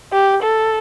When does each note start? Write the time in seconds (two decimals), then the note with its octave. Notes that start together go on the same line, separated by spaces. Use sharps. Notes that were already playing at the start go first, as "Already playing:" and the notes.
0.13 G4
0.42 A4